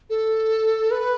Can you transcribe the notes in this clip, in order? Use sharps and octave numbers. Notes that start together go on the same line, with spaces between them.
A4
B4